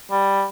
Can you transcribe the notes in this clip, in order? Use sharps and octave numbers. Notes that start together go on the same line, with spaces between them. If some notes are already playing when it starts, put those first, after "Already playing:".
G3